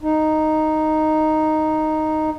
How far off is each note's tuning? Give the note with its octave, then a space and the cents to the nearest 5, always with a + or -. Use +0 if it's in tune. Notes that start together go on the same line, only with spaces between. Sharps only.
D#4 -5